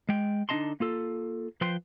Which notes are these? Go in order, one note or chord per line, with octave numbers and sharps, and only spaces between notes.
G#3 G5
D3 D4 D#4 D#5 A5 C6
A#3 F4 A4
F3 B4 C5 G5 C6